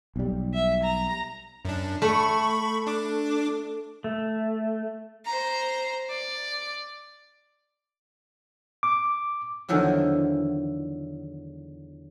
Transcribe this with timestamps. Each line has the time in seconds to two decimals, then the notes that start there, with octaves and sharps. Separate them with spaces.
0.16 B1 G3
0.54 E5
0.83 A#5
1.65 F#2 D4
2.02 A3 B5 C#6
2.87 D4 D6
4.04 A3
5.25 C5 A#5
6.09 D5
8.83 D6
9.69 E2 D3 D#3 F3 F#3 E4